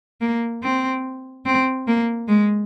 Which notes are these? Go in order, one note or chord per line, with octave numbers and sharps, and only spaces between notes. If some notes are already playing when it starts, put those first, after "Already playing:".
A#3
C4
C4
A#3
G#3